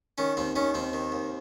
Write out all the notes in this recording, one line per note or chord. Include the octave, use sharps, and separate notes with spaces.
D#3 C#4
D#2 C4
D#3 C#4
D#2 C4
D#3
D#2